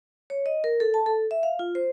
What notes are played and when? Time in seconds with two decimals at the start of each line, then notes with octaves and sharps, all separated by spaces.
0.30 C#5
0.46 D#5
0.64 A#4
0.80 A4
0.94 A5
1.06 A4
1.31 E5
1.43 F5
1.59 F4
1.75 C5